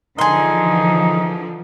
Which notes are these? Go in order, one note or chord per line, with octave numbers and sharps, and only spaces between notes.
D3 E3 F3 D#4 G#4 C6